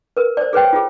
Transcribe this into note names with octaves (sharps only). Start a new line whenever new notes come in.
A#4 B4
C5 D5
G#4 B4 C#5 G5
F4 G#4